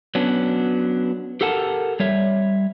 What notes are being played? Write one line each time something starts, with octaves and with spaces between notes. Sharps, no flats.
F#3 B3 C#4 D4
G4 A4 A#4 F#5 A5
G3 C#5 E5